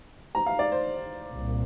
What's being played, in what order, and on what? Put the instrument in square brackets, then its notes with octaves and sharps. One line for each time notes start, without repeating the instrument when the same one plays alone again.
[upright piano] A#5
F5
D5
C5
[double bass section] C2 A#2